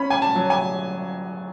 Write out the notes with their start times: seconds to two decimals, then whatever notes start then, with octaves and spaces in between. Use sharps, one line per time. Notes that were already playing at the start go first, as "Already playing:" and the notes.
Already playing: C#4 B5
0.10 G#5
0.22 A5
0.36 F#3
0.50 G#5